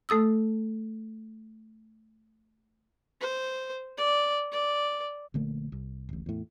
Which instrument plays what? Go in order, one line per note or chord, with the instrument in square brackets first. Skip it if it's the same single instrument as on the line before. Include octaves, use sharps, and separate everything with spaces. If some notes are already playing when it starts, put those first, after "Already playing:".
[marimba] A3 A4 D#6 E6
[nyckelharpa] C5
D5
D5
[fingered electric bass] A#1 D3 A3 A#3
C2
D1 A1
E2 A2